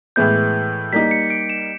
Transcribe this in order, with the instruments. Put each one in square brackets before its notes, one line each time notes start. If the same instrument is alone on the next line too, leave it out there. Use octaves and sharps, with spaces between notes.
[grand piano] A2 E3 G#3 B3 E4 [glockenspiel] G6
[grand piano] G3 A#3 D#4 [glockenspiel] B6
[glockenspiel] C#7
D7
E7